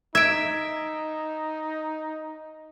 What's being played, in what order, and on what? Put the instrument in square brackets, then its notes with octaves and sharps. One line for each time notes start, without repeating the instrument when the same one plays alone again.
[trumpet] D#4 [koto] E5 [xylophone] G#6 D7